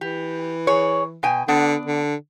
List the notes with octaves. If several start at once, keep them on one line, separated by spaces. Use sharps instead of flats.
E3 G4
G#4 C#5
B2 G5 G#5
D3 B3 D4
D3